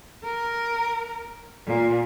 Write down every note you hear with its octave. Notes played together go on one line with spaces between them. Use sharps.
A#4
A#2